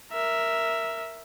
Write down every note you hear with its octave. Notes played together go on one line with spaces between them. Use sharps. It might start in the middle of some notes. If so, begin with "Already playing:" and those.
A#4 E5